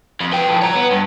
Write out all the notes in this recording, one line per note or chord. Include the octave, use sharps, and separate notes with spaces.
F2
B4 G5
A2 F3
C#5 A#5
B3
G2